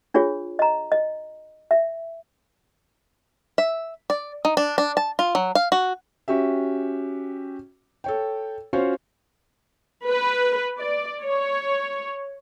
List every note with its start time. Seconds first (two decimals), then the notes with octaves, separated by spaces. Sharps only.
0.14 D4 F4 G#4 C#5
0.59 D#5 A#5
0.92 D#5
1.71 E5
3.58 E5
4.10 D5
4.45 D#4
4.57 D4
4.78 D4
4.97 A5
5.19 F4
5.35 F#3
5.55 F5
5.72 F#4
6.28 C#4 F#4 G4 E5
8.04 A4 C#5 G5
8.73 C#4 F4 F#4 C5 C#5
10.09 B4
10.79 D5
11.23 C#5